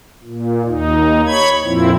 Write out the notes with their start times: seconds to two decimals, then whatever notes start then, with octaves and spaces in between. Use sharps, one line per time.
0.24 A#2
0.66 D#2 D#4
1.26 C#5 B5 G#6
1.64 F2 A#2 F3 C4 E4